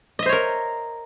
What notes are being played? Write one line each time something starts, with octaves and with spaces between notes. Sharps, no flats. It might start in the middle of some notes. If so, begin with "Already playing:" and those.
A#4 C5 C#5 D#5 E5